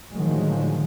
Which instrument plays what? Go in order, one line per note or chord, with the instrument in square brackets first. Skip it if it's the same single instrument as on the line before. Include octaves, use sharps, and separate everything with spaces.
[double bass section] A2 D3 D#3 F3 F#3 G#3